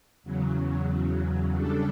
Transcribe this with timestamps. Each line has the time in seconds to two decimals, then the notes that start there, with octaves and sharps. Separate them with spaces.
0.24 E2 C#3 F#3
1.55 C#3 G3 D4 A4